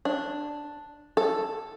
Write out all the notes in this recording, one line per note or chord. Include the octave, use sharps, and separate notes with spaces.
D4
A4